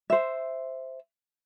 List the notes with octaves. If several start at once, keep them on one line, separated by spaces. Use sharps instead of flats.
C5 E5